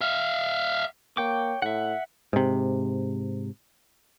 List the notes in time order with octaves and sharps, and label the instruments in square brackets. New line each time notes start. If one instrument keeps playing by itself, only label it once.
[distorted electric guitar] E5 F5
[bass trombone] A#3 [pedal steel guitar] C#5 G5 D6
[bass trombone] A2 [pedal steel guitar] E5 F#5
[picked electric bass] G#2 C3